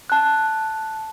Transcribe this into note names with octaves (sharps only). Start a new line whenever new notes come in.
A5 F#6